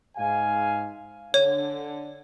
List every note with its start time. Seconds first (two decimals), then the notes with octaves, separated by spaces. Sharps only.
0.16 G#2 F5 G#5
1.34 D3 C#5